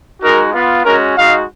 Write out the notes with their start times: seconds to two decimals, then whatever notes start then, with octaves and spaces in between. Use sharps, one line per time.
0.22 G#3 D#4 F#4 A#4
0.54 B3 F4
0.85 G#3 C#4 F#4 A#4
1.16 G#3 D#4 F#4 F5